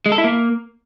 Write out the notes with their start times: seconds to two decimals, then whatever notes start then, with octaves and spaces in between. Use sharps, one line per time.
0.06 G#3
0.12 A4
0.18 E4
0.24 A#3